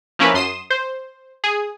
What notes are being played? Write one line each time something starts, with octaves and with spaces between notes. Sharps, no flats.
F3 A#3 C#4 E4 A#4 B4
F#2 C6 D#6 E7
C5
G#4